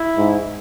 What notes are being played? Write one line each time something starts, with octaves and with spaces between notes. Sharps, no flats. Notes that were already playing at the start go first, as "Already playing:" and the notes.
Already playing: E4
G#2